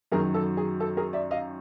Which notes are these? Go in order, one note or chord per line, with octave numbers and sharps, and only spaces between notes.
F#2 D#3 F#3 G#4 A#4
A4
G#4
A4
G#4 A#4
D5 E5
D#5 F5